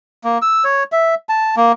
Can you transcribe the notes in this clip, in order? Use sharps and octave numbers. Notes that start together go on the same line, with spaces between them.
A#3
E6
C#5
E5
A5
A#3